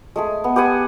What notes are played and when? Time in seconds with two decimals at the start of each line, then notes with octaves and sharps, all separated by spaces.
0.16 G#3 A3 G#4
0.44 B3
0.56 G4 B4 F#5 G#5